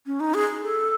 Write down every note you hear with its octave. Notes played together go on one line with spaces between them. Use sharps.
C#4
D#4
G#4
A4